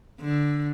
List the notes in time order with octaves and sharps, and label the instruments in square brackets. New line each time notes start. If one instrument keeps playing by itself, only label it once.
[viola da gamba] D3